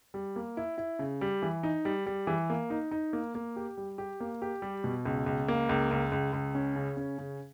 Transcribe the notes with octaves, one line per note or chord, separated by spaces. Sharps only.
G3
A#3
E4
E4
C#3
G3
E3
D#4
G3
G3
E3
A#3
D#4
D#4
A#3
A#3
G4
G3
G4
A#3
G4
G3
B2
C#2
C#2
A#3
C#2
C#2
C#2
C#2
C#4
C#3
C#4
C#3